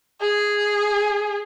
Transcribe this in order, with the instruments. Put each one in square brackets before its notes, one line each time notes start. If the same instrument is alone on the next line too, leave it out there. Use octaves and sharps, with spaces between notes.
[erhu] G#4